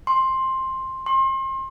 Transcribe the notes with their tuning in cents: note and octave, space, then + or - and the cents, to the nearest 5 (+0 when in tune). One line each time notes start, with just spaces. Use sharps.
C6 +10
C6 +35